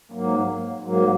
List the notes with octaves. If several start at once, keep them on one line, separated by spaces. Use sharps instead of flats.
G#2 F#3 A#3
G#2 F#3 A#3